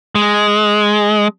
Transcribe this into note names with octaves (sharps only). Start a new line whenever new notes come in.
G#3